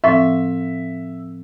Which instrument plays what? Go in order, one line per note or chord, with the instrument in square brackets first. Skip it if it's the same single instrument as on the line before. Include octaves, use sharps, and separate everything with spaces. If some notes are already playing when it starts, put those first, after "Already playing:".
[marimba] A2 F3 C4 [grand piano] E5